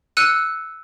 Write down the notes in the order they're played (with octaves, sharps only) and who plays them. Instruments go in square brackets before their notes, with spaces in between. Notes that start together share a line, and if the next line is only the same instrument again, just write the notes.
[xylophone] E6 F#6 C#7 D#7